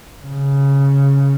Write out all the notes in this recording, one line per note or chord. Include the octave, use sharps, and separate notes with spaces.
C#3